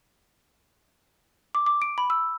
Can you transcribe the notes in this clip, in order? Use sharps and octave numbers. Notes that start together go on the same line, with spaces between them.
D6
D6
D7
B5
E6